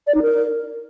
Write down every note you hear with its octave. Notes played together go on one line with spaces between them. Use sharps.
D5
D#4
A#4